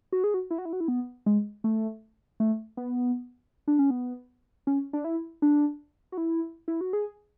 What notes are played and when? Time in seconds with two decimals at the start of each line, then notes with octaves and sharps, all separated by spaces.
0.12 F#4
0.24 G#4
0.34 F#4
0.51 E4
0.58 F#4
0.65 E4
0.73 F#4
0.80 E4
0.88 B3
1.26 G#3
1.64 A3
2.40 A3
2.77 B3
3.68 D4
3.79 C#4
3.90 B3
4.67 C#4
4.93 D4
5.04 E4
5.42 D4
6.12 F#4
6.18 E4
6.68 E4
6.81 F#4
6.93 G#4